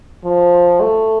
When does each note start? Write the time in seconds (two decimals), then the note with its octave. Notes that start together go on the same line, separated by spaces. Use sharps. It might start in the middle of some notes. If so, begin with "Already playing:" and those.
0.24 F3
0.80 A3